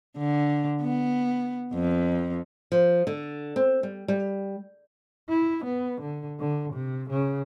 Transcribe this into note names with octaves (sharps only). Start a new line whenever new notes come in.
D3
B3
F2
F3
D3
C4
G3
G3
E4
B3
D3
D3
C3
C#3